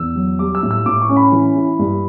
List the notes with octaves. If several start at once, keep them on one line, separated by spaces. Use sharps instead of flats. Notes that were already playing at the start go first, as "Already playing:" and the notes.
Already playing: E2 E6
F#3
G3 D6
E6
A2
E6
A2 D6
C#6
C#4
B5
E3
E4
G2